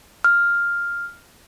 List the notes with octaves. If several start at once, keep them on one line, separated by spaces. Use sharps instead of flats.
F6